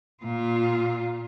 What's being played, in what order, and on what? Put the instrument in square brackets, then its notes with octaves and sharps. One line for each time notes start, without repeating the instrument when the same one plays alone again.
[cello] A#2 F4